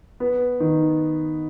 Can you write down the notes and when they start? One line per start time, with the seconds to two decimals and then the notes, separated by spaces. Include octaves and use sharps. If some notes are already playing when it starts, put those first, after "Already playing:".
0.20 B3
0.60 D#3